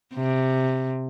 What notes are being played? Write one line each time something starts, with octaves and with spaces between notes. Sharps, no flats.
C3